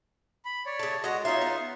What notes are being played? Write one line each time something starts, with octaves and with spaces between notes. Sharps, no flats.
B5
C#5 D5
C#3 A3
G#3 F#4 D#5
C#4 D#4 F4 E5 C6
B3